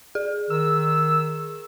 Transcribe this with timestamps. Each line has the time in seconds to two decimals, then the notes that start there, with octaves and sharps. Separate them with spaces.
0.15 G#4
0.50 D#3 E6